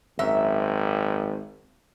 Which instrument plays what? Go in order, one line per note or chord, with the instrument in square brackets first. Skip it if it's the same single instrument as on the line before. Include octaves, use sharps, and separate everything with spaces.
[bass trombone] G#1 [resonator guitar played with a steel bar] F#2 E5